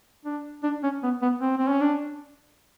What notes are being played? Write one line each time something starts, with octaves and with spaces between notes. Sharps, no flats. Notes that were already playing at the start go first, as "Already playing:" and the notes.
D4
D4
C#4
B3
B3
C4
C4
C#4
D4